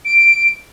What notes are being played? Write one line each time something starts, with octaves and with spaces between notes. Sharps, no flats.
D7